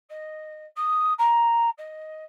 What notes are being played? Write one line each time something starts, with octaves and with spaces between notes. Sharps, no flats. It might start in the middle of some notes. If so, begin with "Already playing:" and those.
D#5
D#6
A#5
D#5